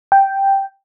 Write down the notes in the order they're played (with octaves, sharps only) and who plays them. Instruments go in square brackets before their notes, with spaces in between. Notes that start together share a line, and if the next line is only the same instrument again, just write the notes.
[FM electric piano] G5